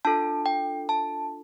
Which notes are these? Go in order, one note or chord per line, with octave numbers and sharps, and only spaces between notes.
D4 F4 A4 A5
G5
A5